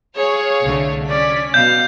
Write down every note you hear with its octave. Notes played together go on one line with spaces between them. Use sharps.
G#4 C#5 F5
C2 D3 A3
C#4 D5 B6
B2 F5 G6